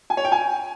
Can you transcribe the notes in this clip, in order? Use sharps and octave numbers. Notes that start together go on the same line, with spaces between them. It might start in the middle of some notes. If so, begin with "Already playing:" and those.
G#5
C#5
G5
G#5